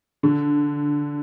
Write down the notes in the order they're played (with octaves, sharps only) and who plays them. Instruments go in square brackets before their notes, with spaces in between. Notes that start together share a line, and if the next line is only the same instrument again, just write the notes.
[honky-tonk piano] D3